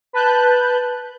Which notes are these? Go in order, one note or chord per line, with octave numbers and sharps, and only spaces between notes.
B4 A5 F#6 G6